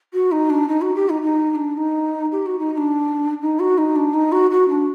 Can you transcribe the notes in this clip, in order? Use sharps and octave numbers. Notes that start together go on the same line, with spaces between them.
F#4
D#4
D4
D#4
F#4
G4
D#4
D#4
D#4
D4
D#4
G4
F#4
D#4
D#4
D4
D#4
F#4
D#4
D4
D#4
F#4
F#4
D4